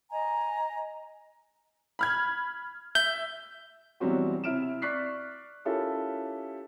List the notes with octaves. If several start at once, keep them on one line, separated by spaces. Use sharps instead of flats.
D#5 G#5 A#5
B5 F6 G#6
E5 G6
B2 E3 F#3 G3 C4 F#4
C3 E4 F6 D7 E7
D5 C#6 F#6 B6 C7
C#4 E4 F4 G4 A4 A#4